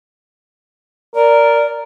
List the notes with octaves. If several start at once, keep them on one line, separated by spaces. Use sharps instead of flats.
A#4 D5